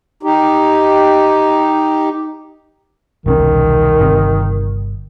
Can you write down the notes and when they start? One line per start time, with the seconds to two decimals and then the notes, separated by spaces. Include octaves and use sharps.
0.23 D#4 G4
3.26 E1 C2 D#3 C#4
4.01 G1 C3